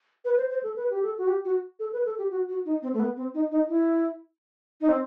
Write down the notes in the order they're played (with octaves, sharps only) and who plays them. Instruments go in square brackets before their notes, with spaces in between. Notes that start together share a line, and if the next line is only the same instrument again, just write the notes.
[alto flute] B4
C5
C5
A4
B4
G4
A4
F#4
G4
F#4
A4
B4
A4
G4
F#4
F#4
D#4
C4
A3
B3
C4
D#4
D#4
E4
D#4
C4